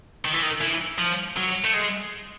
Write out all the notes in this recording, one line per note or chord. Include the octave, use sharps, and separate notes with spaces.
D#3
E3
D#3
E3
F3
F#3
A3
G#3